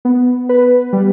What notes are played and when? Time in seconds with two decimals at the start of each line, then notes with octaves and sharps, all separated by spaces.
0.05 B3
0.49 B4
0.93 G3